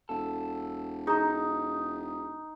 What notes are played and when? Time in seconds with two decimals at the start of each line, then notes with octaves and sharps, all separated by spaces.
0.09 E1 A4
1.07 D#4 G#4 A#5